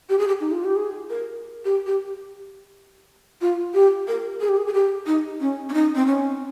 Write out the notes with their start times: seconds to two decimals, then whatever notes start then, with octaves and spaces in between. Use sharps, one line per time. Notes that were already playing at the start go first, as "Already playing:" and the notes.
0.09 G4
0.19 G#4
0.28 G4
0.40 D#4
0.52 F4
0.64 G4
0.76 G#4
1.10 A#4
1.65 G4
1.87 G4
3.41 F4
3.74 G4
4.08 A#4
4.41 G#4
4.49 G4
4.57 G#4
4.67 G#4
4.73 G4
5.07 D#4
5.40 C#4
5.69 C#4
5.74 D#4
5.95 C4
6.06 C#4